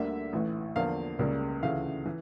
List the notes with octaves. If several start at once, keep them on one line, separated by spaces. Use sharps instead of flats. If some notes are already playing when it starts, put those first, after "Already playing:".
Already playing: D2 D3 G3 A#3 E5
A1 A2 E3
E2 D3 F3 A#3 F5
C#2 C#3 G3 A#3
D2 C#3 E3 A3 F5
E3